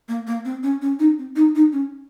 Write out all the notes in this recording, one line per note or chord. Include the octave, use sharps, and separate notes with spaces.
A#3
A#3
C4
C#4
C#4
D#4
C4
D#4
D#4
C#4